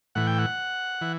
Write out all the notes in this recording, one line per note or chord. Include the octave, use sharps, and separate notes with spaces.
A2 E3 F#5
G5
F#5
E3